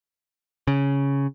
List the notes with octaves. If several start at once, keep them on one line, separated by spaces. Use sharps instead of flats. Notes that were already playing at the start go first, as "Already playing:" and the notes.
C#3